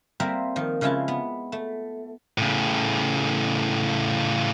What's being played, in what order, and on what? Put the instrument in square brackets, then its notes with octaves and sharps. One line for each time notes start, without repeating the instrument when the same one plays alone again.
[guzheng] G3 A#3 C4 A#4 C5 E5
D#3 F3
C#3 F3 G#3 E4 F4 A5
B3
A3
[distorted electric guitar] A2 C#3